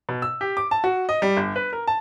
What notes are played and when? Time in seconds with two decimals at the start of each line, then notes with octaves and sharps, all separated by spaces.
0.09 B2
0.22 E6
0.41 G4
0.57 D6
0.71 A5
0.84 F#4
1.09 D#5
1.22 G3
1.37 G1
1.56 B4
1.73 A#4
1.87 A5